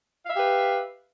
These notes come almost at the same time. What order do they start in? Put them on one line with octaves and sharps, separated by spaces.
F5 E5 G4 B4